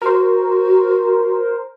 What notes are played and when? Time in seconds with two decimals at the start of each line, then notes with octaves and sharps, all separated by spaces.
0.02 F#4 A#4 C5